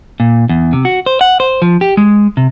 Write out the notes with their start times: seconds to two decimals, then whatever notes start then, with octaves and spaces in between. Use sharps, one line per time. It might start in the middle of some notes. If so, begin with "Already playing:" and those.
0.20 A#2
0.49 E2
0.73 C3
0.85 F#4
1.06 C5
1.21 F#5
1.40 C5
1.62 F3
1.81 G4
1.97 G#3
2.37 C3